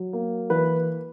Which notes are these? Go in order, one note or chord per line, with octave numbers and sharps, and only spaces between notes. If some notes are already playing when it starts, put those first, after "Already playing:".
Already playing: F#3
A#3
E3 B4